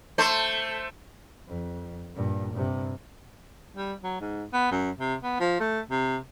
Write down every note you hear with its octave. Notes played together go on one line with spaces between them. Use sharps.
A3 C5
F2
G2 A#2
G2 C3
G3
F#3
G#2
B3
F#2
C3
B3
F3
A3
C3